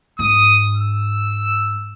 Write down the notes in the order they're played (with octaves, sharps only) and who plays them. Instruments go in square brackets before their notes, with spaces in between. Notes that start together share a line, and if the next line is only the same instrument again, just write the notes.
[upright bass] G#2 [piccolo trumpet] D#6
[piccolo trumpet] E6